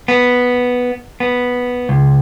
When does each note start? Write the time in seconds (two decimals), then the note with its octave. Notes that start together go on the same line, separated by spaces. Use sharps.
0.08 B3
1.20 B3
1.89 C#2